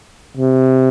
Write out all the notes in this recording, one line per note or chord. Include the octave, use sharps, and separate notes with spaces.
C3